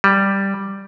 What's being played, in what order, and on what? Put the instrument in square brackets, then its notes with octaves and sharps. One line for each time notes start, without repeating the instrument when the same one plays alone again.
[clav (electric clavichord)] G3